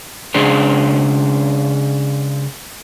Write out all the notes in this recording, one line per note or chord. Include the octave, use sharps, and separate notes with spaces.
C#3 G#3 D4 G#4 C5